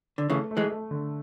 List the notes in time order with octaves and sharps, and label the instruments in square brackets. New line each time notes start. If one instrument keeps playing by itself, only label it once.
[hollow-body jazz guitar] D3
[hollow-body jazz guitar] C#3 E3 [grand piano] A3
[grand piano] A3
[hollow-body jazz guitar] E3 G#3
[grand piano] A3
D3